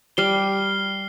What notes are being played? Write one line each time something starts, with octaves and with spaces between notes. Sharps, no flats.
G3 F6 C7 G7